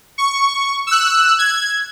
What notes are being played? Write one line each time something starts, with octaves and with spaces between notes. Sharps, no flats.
C#6
E6 F#6
G#6